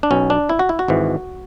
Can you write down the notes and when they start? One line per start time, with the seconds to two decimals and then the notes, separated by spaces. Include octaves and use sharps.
0.03 D4
0.11 B1 B2 C#4
0.30 D4
0.49 E4
0.59 F#4
0.69 E4
0.79 F#4
0.88 G#1 G#2 E3